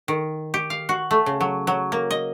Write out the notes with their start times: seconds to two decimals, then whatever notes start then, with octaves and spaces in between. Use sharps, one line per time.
0.08 D#3
0.54 G4
0.70 F5
0.89 F#4
1.11 A3
1.26 C#3
1.41 F#3
1.67 F#3
1.92 A#3
2.11 D#5